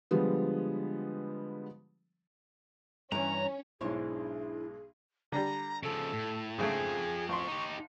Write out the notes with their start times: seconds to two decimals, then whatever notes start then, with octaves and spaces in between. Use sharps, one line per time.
0.11 D3 F3 G3 G#3 B3
3.12 G2 E3 C#4 A#5
3.81 B1 G#2 D4 E4 G#4 C5 C#5
5.32 D3 G3 A#5
5.83 C#3 F3 A4
6.13 A2
6.58 G#2 C#3 F3 A3 C4 G#4
7.29 A1 C6 C#6
7.48 D#4 G4